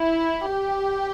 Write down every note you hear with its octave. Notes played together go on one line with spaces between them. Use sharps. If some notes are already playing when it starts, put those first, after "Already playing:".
Already playing: E4
G4